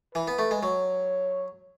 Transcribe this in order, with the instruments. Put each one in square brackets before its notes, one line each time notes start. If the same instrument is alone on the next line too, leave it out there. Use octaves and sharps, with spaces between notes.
[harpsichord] E3 [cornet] B4
[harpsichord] B3
A3
G#3
[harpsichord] F#3 [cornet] C#5